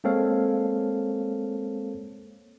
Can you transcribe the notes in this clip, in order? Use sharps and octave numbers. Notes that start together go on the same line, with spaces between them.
G#3 A#3 C4 A4 C#5 F5